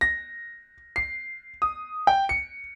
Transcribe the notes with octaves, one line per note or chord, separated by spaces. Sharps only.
A#6
C7
D#6
G5
C#7